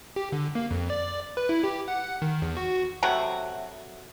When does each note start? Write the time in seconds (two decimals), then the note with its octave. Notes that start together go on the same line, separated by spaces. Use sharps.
0.16 G4
0.32 D3
0.55 A#3
0.71 F2
0.90 D5
1.37 B4
1.49 E4
1.64 G4
1.88 F#5
2.22 D#3
2.42 E2
2.57 F#4
3.03 C3 F#3 A3 F#4